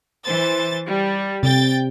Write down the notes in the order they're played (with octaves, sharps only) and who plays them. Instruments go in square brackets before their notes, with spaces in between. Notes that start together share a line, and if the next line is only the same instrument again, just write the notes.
[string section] E3 C5 A6
G3
[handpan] C3 [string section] G5 A6